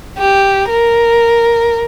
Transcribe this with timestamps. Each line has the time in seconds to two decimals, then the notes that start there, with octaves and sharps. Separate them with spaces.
0.19 G4
0.69 A#4